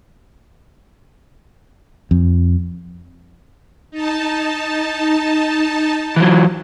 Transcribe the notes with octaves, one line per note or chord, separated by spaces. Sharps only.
F2
D#4 A5
E3 F#3